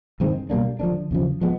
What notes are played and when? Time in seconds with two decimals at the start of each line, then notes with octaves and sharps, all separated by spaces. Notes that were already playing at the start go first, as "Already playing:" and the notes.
0.20 G2 D#3 G#3 C4
0.50 B2 G3 A#3 D4
0.79 D3 F3 A#3 D4
1.11 E2 C#3 F3
1.41 F3 G#3 B3